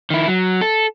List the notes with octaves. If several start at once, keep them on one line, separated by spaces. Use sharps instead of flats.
D#3 E4
F#3
A4